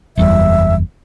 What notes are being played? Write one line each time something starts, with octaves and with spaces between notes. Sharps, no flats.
F#1 E2 G3 E5